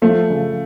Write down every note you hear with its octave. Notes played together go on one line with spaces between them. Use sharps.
F3 A3
C#3